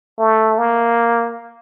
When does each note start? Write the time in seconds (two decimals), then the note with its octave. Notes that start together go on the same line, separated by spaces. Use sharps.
0.19 A3
0.58 A#3